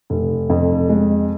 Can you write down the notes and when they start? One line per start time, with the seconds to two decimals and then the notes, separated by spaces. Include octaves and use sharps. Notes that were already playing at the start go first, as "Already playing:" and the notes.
0.10 F1
0.50 F2
0.89 G#3